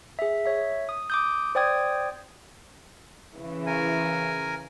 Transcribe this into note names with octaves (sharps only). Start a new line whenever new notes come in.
G#4 E5
C#5 E5
D#6
D6 D#6 G6
C5 D5 G5 D#6 G#6
C#3 E3
A#4 G#5